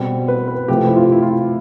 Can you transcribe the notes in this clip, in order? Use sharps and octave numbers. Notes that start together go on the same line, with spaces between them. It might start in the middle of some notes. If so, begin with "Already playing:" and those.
Already playing: B2 G3 C4
B4
B4
C3 F3 A3 C4 G4
E4
F4
E4
F4